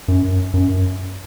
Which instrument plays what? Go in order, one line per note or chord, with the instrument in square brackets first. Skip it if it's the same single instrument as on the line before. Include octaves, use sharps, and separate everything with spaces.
[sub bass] F#2
F#2